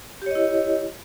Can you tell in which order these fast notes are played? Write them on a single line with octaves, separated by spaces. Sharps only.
G4 C#5 D#5 E4